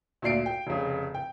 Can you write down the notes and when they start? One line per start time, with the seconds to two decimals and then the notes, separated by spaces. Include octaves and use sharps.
0.22 D2 A#2 D5 C7 D7
0.46 G5
0.67 F1 C#3
1.15 G5